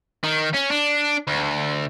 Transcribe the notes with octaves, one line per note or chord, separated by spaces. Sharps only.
D#3
C#4
D4
D2